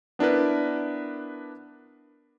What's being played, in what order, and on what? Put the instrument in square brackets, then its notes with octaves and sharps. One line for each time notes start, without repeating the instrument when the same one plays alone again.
[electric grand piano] B3 D4 E4 A#4 B4